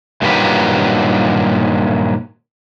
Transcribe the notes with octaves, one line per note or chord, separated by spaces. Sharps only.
G2 A#2 D#3 F#3 G4 B4